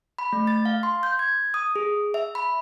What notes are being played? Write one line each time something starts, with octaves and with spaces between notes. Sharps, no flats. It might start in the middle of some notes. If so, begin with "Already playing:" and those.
B5
A3
A6
F5
C6
G6
G#6
D#6
G#4
E5
B5